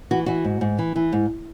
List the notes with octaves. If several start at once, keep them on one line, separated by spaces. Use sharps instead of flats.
E3 F#4
E3 F#4
G#2
G#2
E3
E3
G#2